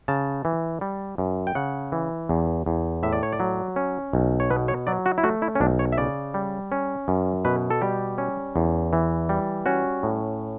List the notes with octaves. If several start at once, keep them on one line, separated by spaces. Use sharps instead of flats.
C#3 A5
E3
G3
F#2
G5
C#3 F#5
E3
E2
E2
A2 E5
D5
C#5
D5
F#3
C#4
B1
C#5
B2 B4
C#5
F#3 D5
F#4
E4
A3 F#4
E4
C#4
B1 D4
C#5
E5
C#3 D5
G3
C#4
F#2
B2 B4
A4
G3 G4
C#4
E2
E3
G3
C#4 F#4
A2